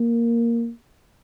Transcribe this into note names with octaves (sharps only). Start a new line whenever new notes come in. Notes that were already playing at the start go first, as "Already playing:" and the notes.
Already playing: A#3